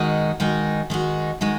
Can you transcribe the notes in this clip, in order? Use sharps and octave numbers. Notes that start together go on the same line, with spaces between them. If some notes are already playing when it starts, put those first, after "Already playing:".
Already playing: D#3 G#3 D#4 F#4
D#3 G#3 D#4 F#4
D#3 G#3 D#4 F#4
D#3 G#3 D#4 F#4